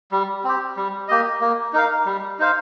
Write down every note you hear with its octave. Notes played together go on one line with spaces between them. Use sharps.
G3
C4 G4
G3
A#3 G4 D#5
A#3
D#4 A#4 F5
G3
D#4 C5 F5